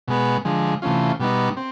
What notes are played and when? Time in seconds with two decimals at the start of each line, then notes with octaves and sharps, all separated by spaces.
0.08 B2 G#3 B3
0.45 D3 F3 G#3
0.82 C3 E3 A3 C#4 F4
1.20 B2 G3 B3 D#4
1.57 C4